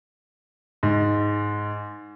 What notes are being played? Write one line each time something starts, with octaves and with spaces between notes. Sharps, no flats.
G#2